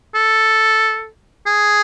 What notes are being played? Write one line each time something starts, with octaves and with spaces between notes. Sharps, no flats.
A4
G#4